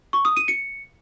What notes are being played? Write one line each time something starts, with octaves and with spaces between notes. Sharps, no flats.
C#6
D#6
D#7
C#7